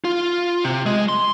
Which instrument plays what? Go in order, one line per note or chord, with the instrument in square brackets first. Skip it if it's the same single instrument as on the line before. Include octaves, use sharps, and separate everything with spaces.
[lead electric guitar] F4
C3
G#3
C6